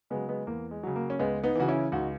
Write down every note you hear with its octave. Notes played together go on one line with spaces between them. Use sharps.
C#3 F#3 G#3 B3
G#3 B3
E2 A#3
G#3
C#3 F#3
A#3
C#4
C#2 G#3 B3
B3 D#4
C#3 E3 F#4
C#4 E4
C#2 D#4 F#4